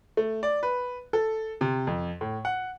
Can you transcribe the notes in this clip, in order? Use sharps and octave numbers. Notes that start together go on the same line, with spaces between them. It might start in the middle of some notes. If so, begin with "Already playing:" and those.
A3
D5
B4
A4
C3
F2
A2
F#5